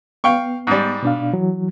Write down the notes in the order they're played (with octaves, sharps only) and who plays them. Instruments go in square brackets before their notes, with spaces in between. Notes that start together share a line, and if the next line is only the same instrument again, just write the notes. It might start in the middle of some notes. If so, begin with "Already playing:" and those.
[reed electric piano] B3 [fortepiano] F5 G5 C#6
[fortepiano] G#2 G3
[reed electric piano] B2 D4 F5
E3 F#3